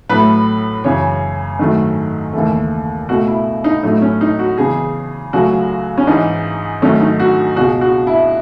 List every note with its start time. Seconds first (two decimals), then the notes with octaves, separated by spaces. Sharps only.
0.09 A2 F#3 A3 B4
0.84 F#2 C#3 E3 C#5
1.59 G#2 D#3 F#3 A3
2.33 D#2 C#3 E3 A3
3.08 C#2 B2 A3 F#4
3.27 E4
3.64 D#4
3.83 A2 F#3 A3 D#4
4.02 C#4
4.21 D#4
4.39 F#4
4.58 E2 C#3 G#3 G#4
5.33 C#2 C#3 F#3 A3 F#4
5.98 C#4
6.07 G#2 E3 G#3 D#4
6.82 G#2 D#3 F#3 A3 C#4
7.01 D#4
7.20 F#4
7.56 C#2 B2 G#3 F#4
7.81 F#4
8.07 E4